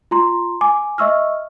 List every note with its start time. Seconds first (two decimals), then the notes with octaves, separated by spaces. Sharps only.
0.11 F4 A#5 C6
0.61 G#5 D6
0.98 D#5 E5 C#6 E6 F6